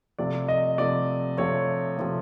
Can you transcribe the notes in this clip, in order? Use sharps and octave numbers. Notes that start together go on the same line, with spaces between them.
C3 F3 A3 D5
D#5
C3 F3 A3 D5
C3 F3 A3 C#5
C3 F3 A3